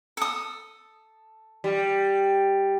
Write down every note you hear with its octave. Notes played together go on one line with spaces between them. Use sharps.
A4 D#6
G3